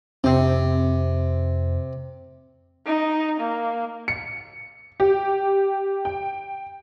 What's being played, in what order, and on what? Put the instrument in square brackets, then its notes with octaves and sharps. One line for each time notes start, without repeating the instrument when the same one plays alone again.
[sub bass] F2 [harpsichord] C3 [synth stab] C4
[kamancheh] D#4
A#3
[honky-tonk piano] C#7
G4
G5